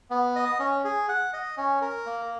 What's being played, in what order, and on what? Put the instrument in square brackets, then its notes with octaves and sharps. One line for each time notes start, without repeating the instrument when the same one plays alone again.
[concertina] B3
D#5
C#4
G#4
F#5
D#5
C#4
A#4
A#3